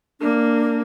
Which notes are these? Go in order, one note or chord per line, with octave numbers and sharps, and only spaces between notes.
A#3 D4